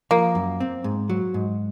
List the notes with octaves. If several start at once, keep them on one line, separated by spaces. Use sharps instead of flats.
F3 A#3
F#2
C4
G#2
F#3
G#2